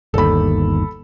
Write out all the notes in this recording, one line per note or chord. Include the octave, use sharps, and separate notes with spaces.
G1 D#2 A4 B5